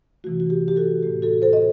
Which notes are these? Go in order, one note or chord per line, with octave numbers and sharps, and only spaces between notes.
C3 E3 A3 F#4
F#4
G4
G4
F#4 A4
A2 E3 A3 G4
F#4 A4
A4 C5
D#5